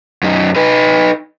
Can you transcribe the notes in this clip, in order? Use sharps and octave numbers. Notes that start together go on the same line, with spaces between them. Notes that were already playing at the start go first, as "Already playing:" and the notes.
F#2 D#4
D#4 B4